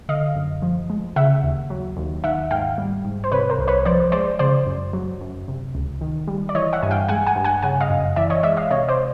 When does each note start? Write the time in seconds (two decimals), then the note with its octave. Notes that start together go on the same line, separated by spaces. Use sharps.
0.09 D3 D#5 F5
0.35 F#2
0.62 F3
0.90 G#3
1.16 C#3 E5 F#5
1.43 D#2
1.70 F#3
1.97 D#2
2.24 D#3 E5 F#5
2.51 G#2 F5 G5
2.78 G3
3.05 G#2
3.24 C5
3.32 C3 B4 C#5
3.50 A#4 C5
3.59 C2
3.68 B4 C#5
3.85 F3 C5 D5
4.12 G#3 C5 D5
4.39 C#3 C5 D5
4.66 F#2
4.93 F#3
5.21 F#2
5.48 C3
5.75 C#2
6.01 D#3
6.28 G3
6.49 D5
6.55 E3 C#5 D#5
6.73 E5 F#5
6.83 G2 G#5
6.91 F5 G5
7.09 G#3 F#5 G#5
7.27 F#5 G#5
7.36 G2
7.45 F#5 G#5
7.63 C#3 F#5 G#5
7.81 D#5 F5
7.90 F#2
8.16 E3 D5 E5
8.30 C#5 D#5
8.43 G#3 D5 E5
8.57 D#5 F5
8.71 C3 C#5 D#5
8.88 C5 D5